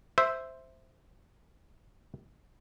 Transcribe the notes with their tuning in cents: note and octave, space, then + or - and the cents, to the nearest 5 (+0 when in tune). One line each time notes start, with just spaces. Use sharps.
C5 +0 E5 +0